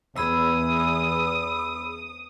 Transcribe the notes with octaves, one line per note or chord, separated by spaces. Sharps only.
E2 G#4 B5 D#6 E6